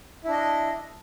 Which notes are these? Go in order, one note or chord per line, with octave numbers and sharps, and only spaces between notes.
D4 E4 D#5